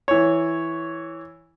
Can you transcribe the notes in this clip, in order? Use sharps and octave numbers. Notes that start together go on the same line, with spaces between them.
E3 C#5